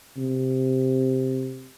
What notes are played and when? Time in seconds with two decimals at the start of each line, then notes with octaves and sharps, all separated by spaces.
0.17 C3